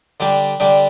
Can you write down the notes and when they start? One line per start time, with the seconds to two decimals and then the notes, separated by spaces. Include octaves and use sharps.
0.20 D3 G3 D4 G4
0.60 D3 G3 D4 G4